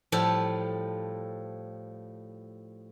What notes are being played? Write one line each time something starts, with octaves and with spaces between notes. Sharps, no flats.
A2 F3 G3 A4